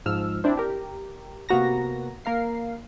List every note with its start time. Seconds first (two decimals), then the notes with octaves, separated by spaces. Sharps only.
0.06 G#2 F3 E6 F6
0.44 C4 D4 E4
0.57 G4 A#4
1.49 C3 A#3 B3 F#4 A#5 A#6
2.25 A#3 A#4 F5 C7